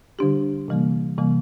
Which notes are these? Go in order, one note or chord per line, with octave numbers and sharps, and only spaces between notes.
D3 G3 D4 G4
C3 E3 G3 A#3
C3 E3 G3 A#3